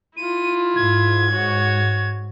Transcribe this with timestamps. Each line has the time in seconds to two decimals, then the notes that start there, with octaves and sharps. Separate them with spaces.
0.17 E4 F4 D#7
0.76 G#2 G#6
1.31 F#4 C#5